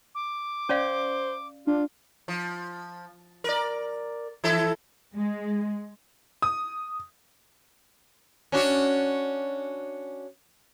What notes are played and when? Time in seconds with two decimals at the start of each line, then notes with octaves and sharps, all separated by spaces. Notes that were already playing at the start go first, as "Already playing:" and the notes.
0.15 D6
0.69 C#4 C5 D5 F5
1.67 D4 F4
2.28 F3
3.44 A#4 D5
4.44 E3 E4 A4
5.16 G#3
6.42 D#6
8.52 C#4 D4 F#4